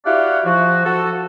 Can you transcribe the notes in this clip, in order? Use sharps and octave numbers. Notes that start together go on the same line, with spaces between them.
E4 F#4 G4 D5 F5 F#5
F3 F#4
F#4 A4